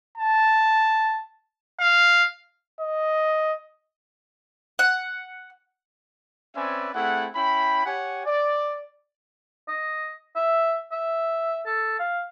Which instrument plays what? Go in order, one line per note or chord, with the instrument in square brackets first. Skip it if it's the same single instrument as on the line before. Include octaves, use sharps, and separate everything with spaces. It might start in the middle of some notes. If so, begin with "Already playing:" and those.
[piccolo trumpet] A5
F5
[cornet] D#5
[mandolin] F#5
[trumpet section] C4 C#4 B4 D5 E5 G#5
A3 C4 E4 G#4 F#5
C#4 E4 G5 B5
G4 C#5 F#5 G#5
D5
[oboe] D#5
E5
E5
A4
F5